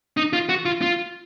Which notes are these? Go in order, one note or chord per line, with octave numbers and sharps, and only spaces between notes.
D#4
F4
F#4
F4
F4